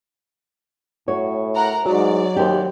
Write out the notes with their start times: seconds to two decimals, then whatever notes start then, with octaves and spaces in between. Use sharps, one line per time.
1.08 A2 F#4 C#5
1.55 A#4 F#5 A#5
1.85 G#2 F#3 D5
2.36 D#2 G4 C5